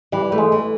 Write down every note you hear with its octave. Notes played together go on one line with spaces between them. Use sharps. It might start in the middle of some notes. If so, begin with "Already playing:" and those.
E3 G3
A3
G#3
E3